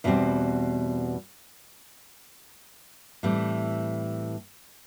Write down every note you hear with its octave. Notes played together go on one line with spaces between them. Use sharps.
E2 B2 G3 C4
A2 E3 G3 C4